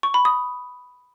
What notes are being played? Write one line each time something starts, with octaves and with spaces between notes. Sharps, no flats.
C#6
B5
D#6